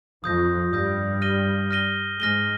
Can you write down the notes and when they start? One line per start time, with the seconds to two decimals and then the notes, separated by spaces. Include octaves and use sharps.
0.24 F2 F3 D#6 G6 A#6
0.73 G2 G3 D#6 G6 A#6
1.22 F6 A#6 D#7 G7
1.71 F6 A#6 D#7 G7
2.20 G#2 G#3 F6 A#6 D#7 G7